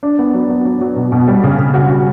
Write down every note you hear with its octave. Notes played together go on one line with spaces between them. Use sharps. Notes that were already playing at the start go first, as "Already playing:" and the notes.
D4
B3
F#3
B3
F#3
F#3
B2
B2
G3
C#3
C#3
F#4
F#4